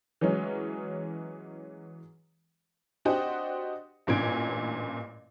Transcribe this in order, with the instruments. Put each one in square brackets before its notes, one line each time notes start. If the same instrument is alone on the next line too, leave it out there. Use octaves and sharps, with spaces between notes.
[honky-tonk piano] E3 F#3 G#3 C#4
D4 F#4 G4 C5 D#5 F#5
A1 G2 A#2 C#4 G#6 D7